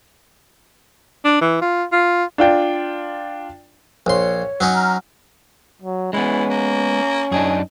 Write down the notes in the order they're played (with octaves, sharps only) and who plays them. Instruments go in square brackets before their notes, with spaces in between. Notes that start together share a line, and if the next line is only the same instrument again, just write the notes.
[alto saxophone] D4
E3
F4
F4
[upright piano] D4 F4 G5
[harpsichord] A#1 C6 [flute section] C#5
[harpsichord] F#3 C#4 D#4
[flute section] A#5 F6
[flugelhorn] F#3
[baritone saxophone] E3 [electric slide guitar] G#3 B3 [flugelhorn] C#4
[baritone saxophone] A#3
[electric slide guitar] F#2 D4 D#4 [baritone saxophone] G#4